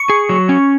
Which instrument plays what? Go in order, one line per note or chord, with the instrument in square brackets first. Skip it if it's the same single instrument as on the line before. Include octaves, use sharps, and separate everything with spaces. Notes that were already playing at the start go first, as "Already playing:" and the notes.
Already playing: [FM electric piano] C#6
[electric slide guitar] G#4
F#3
C#4